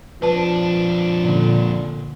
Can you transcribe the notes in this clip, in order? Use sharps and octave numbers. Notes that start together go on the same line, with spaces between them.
F2 F3 D4 B4 A5
A#2 D3